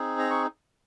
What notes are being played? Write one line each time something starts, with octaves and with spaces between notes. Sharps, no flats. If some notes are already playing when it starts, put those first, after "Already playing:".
Already playing: C4 D#4 G#4
A#5
C#6